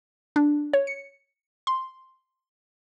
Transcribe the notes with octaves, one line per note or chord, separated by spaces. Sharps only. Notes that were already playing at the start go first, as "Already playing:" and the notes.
D4
C#5
C#7
C6